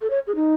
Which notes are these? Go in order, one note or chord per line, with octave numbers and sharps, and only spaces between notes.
A4
C#5
G#4
D#4